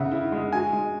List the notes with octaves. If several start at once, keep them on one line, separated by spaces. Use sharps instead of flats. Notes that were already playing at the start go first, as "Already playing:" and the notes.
Already playing: C#3 B3 E5 F#5
E4
G#3
F#4 G#5
G#3